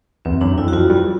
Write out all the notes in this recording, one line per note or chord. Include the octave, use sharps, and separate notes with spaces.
E2 C4
F#2 D4
F2 E4
F#4
F2 F4
G2